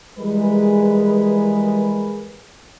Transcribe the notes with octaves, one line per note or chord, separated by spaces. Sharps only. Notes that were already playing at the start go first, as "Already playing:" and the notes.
E3 G3 G#3 G#4 A#4 B4